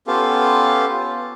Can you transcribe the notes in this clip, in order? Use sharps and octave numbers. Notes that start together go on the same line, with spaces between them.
B3 C#4 F4 G4 A4 F5